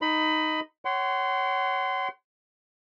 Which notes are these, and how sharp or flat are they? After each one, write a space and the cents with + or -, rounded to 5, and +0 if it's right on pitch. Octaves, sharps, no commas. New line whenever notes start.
D#4 +0 D#5 +0 B5 +20
C#5 +0 F#5 +35 C6 -20